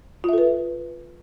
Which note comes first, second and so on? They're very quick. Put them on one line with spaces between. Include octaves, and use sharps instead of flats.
F4 E5 A4 B4